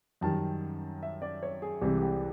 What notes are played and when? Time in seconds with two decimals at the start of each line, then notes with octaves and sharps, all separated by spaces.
0.21 F#2 D#3 G3 A5
1.03 E5
1.22 D5
1.43 C#5
1.62 G#4
1.81 C2 C3 E3 G#3 G4
2.01 G4